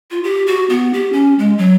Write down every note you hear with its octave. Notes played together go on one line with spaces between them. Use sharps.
F4
G4
F#4
B3
G4
C#4
G#3
F#3